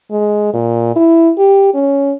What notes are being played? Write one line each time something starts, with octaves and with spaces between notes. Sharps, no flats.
G#3
A#2
E4
G4
C#4